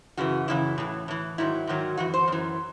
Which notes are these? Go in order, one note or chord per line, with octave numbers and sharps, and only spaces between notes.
F#2 C#3 E3 F#4
F#2 C#3 E3 E4
A2 E3
A2 E3
G#2 D#3 F#3 E4
G#2 D#3 F#3
F#2 E3 F#4
C5
F#2 E3